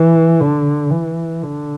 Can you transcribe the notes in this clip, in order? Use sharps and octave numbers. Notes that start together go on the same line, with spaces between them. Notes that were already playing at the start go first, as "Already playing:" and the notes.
Already playing: E3
D3
E3
D3